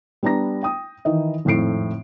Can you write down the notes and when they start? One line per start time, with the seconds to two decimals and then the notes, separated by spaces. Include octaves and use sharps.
0.23 G3 B3 D4 A#5 A#6
0.63 G5 D#6
1.05 D#3 E3 D#4 E4 D#5
1.45 G#1 F2 A2 A3 C7 D7